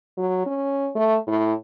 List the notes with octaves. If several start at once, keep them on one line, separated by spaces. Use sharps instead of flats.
F#3
C#4
A3
A2